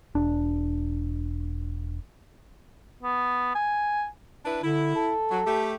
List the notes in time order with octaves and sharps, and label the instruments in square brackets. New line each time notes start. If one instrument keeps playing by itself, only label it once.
[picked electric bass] E1 D4
[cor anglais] B3
G#5
[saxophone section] D4 E4 B4
[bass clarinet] D3 [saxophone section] E4
[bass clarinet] A4
[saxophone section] F#3
A3 G4